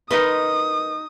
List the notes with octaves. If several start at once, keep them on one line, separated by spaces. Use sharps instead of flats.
D#4 A#4 B4 D#5 C6 D#6